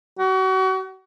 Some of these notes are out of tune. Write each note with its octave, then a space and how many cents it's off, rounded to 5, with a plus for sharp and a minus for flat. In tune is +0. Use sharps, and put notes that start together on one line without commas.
F#4 +35